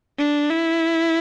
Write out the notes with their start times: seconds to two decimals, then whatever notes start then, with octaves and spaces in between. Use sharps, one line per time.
0.19 D4
0.51 E4